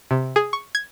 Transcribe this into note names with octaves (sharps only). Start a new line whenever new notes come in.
C3
G#4
C#6
G#6